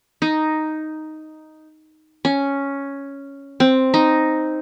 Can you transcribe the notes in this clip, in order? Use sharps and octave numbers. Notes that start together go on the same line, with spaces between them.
D#4
C#4
C4
D#4